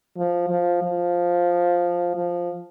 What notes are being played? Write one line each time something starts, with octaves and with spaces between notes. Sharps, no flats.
F3
F3
F3
F3